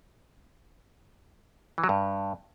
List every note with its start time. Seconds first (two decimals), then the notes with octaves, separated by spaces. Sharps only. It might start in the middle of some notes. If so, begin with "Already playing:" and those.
1.78 E3
1.84 F#3
1.89 G2